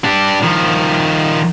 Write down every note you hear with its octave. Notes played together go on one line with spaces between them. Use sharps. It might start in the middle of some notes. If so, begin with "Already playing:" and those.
D4 G4
D#3 F3